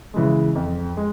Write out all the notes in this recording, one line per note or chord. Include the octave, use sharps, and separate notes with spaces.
C#3 E3 G#3
F2
G#3